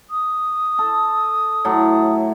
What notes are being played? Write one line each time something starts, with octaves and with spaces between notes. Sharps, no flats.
D#6
A4
A2 F#3 A4